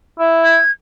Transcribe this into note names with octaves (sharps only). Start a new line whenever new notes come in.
E4
G#6